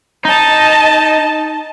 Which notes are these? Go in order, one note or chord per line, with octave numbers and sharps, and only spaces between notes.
D#4 D#5 A5